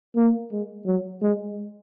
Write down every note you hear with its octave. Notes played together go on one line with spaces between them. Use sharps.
A#3
G#3
F#3
G#3